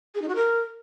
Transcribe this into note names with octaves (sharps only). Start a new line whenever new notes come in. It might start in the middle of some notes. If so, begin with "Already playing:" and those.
G#4
D#4
F#4
A#4